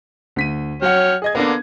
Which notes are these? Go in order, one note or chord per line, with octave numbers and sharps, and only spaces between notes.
D2 B6 D#7
F#3 C#5 F#5 G5 F6
G#4 D#5 G#6
D3 A#3 B3 D4